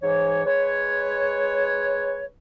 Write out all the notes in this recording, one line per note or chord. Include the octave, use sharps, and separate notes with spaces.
G#2 E3 C#5
G#3 B4 C#5